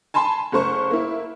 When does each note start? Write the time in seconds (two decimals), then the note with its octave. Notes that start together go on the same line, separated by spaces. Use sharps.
0.14 G#5 A5 B5 C6
0.52 F#1 A3 C5 C#6
0.90 A#3 E4